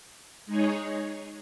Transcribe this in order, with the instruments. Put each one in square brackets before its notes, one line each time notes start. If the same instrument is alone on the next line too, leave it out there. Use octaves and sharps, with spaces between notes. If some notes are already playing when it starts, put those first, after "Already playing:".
[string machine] G#3 D#4 G#4 C#5